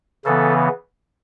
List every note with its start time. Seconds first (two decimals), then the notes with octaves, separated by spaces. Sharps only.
0.25 C#3 E3 B3 A4